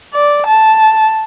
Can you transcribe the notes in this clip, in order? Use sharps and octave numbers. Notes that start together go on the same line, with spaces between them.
D5
A5